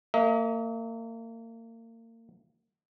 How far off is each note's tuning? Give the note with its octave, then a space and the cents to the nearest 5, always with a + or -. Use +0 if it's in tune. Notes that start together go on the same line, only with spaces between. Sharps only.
A#3 -35 D#5 +40